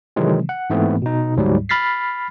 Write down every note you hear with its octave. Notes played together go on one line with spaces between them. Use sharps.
C3 D#3 E3 F#3 G#3 C4
F#5
G#2 E3 A3 B3 C4
B2 D#4
D2 G#2 F#3 G3
B5 F6 A6 B6 C7